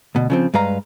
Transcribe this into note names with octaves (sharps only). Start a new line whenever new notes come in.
D2 B2
C#3 F3 C4
G2 G#3 B4 F5 A#5